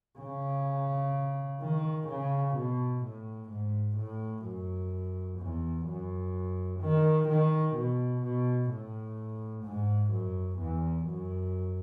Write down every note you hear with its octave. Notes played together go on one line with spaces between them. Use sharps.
C#3
D#3
C#3
B2
A2
G#2
A2
F#2
E2
F#2
D#3
D#3
B2
B2
A2
G#2
F#2
E2
F#2